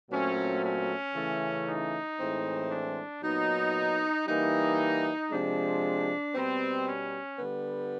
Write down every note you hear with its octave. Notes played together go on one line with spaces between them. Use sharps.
A#2 F#3 A3 C4 C#4
C#4
C#3 E3 A3
D#4
A2 E3 G#3 C4
D4
A#2 F#3 B3 D#4
E3 G3 A#3 D#4
C3 F3 G#3 D4
B2 G3 B3 C4
C#4
D3 G3 B3